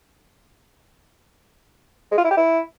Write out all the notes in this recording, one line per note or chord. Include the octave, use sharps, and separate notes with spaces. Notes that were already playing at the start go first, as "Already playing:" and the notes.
G#3
F4
E4
G4
E4